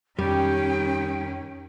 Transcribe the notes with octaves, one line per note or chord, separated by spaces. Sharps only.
F2 D#3 G3 C#4 G4 G5